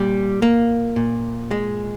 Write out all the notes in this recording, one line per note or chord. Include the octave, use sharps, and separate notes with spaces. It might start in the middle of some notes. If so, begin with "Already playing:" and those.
Already playing: A#2 G3
A#3
A#2
G#3